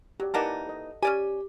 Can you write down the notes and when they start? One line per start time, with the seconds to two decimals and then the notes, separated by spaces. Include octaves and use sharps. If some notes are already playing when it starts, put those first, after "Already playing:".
0.20 F#3 G4 D5
0.34 E3 A#3 D#4 D5 F#5 A5
0.67 A4 D#5
1.03 C#4 G4 D5 G#5